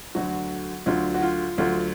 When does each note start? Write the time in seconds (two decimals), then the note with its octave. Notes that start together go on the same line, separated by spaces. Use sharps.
0.15 D2 D3 F#3 F#4
0.86 D2 D3 F#3 F4
1.14 F#4
1.22 F4
1.58 D2 D3 F#3 F4